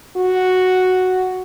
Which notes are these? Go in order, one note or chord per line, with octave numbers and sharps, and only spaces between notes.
F#4